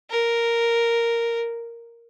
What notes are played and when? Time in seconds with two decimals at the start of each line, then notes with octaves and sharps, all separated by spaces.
0.10 A#4